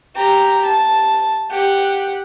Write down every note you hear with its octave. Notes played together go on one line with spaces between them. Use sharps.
G4 A#5
A5
G4 F#5